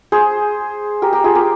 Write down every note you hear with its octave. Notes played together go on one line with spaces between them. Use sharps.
G#4 C5
G4 A#4
G4 A#4
F4 G#4
G4 A#4